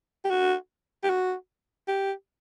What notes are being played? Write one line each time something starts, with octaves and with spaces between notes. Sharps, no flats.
G4
F#4
G4
F#4
G4